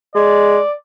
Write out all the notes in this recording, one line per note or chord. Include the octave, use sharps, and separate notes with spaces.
G#3 D5